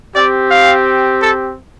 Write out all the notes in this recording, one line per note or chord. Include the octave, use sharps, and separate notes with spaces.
C4 G4 D5
F5
A4